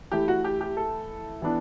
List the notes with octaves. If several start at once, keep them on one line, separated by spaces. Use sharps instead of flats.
E3 A3 E4 G4
F#4
G4
G4
A4
E3 B3 D4